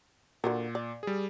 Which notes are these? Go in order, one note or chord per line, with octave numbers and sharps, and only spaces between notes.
A#2 D3 F#4 A#4
D5
G3 G#4